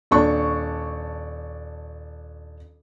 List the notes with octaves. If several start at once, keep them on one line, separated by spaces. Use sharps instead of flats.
D#1 D4 C#6